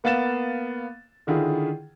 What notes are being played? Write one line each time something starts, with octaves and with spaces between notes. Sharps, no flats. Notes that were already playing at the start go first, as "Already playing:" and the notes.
A#3 B3 F5 A6 E7
D3 D#3 E4 F4 G#4